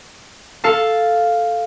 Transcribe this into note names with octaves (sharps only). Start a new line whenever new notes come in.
A4 F5 A5